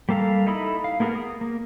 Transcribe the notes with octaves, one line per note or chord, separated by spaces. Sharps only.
G3 A#3 A4 F5 A#5
D#4 E4 A4 B5 D#6
F5
A#3 B3 G#4 A#4
D#6
A#3